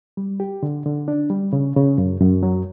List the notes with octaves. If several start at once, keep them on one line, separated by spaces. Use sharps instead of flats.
G3
G4
D3
D3
D4
G3
C#3
C#3
F#2
F#2
F#3